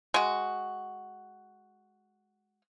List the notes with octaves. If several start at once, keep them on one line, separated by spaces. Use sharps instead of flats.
G#3 F#4